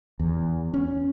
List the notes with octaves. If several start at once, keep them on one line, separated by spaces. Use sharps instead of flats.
E2
C#4